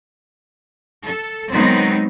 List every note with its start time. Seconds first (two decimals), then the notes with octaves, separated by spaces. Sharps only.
1.03 A4
1.52 D#3 F#3 G#3 B3 C4 D#4